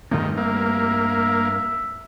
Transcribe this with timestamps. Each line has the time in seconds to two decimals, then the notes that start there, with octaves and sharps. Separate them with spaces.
0.11 G2 D#3 A3 C4
0.37 A#3 E5